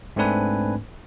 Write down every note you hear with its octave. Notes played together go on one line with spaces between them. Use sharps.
G#2 A3 C4 D4 B4 G#5